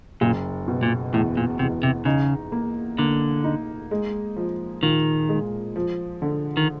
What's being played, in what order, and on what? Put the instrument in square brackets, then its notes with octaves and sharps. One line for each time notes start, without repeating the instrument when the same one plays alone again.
[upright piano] F#1 [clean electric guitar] A#2
[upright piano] B2
[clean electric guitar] A#2
[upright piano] E2 [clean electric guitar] A2
[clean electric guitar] A#2
[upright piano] E2 [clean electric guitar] C3
[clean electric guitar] C3
[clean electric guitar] C#3 [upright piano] D#4
[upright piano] A#3
[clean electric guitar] D3 [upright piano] A#3
[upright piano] D#4
G#3
F3
[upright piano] A#2 [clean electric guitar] D#3
[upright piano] G#3
F3
D3
[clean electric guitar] D#3